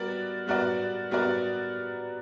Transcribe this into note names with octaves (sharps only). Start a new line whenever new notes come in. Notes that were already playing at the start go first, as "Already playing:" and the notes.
Already playing: G3 B3 F#4 A#4 D5
G3 B3 F#4 A#4 D5
G3 B3 F#4 A#4 D5